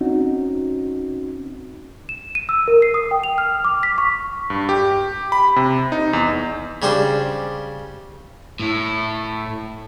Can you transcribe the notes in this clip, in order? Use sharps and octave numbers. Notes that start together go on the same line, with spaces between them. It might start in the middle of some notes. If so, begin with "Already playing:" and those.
C4 C#4 D#4 F#4
E7
D#7
E6
A#4
C7
D#6
G5
F7
F6
D6
B6
C#6
G2
G4
B5
C3
D#4
E2
C#3 G3 D4 C5
A2 E4